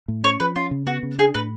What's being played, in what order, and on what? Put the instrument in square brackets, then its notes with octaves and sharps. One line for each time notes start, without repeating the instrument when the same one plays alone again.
[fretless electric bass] A2
[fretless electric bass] C#4 [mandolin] C#5
[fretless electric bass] F3 [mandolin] B4
[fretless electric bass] C#4 [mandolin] F4
[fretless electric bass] C#3
[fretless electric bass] B3 [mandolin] F#4
[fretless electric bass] C#3
[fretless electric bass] D4 [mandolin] G#4
[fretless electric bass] A2 [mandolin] B4